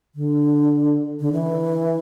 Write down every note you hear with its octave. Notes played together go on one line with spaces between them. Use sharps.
D3
D3
E3